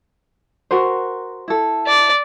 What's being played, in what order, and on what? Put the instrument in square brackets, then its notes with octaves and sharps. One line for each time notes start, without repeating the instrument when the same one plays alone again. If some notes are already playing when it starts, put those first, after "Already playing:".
[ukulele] F#4 A#4 C5
E4 A4
[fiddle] D5